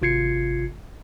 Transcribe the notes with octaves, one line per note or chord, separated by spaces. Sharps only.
G#1 C3 F4 G#6 C7 C#7